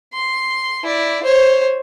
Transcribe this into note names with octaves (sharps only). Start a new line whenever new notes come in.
C6
E4 D5
C5 C#5